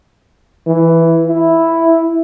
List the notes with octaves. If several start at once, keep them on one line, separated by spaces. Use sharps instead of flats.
E3
E4